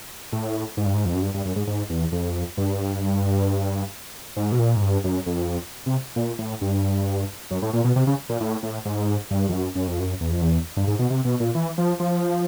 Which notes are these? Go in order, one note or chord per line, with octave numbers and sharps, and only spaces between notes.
A2
G#2
G2
G#2
F2
F#2
G2
G2
F#2
G#2
G#2
E2
F2
G2
G#2
B2
A#2
G#2
G2
F#2
F2
C3
A#2
A2
G2
F#2
A2
A#2
B2
C3
C#3
A#2
A2
A2
G#2
G2
F2
F#2
F#2
F2
F#2
E2
F2
E2
G2
G#2
B2
C3
B2
A#2
E3
F3
F3